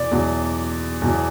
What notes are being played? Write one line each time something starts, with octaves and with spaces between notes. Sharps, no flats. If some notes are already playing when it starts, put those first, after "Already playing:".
Already playing: E2 B2 D5
E2 B2 F#3
E2 B2 F#3